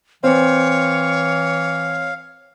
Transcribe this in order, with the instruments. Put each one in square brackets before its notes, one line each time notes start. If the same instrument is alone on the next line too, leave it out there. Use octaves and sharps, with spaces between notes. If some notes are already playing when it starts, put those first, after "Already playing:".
[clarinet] E3 [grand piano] C4 [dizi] C#5 [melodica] F5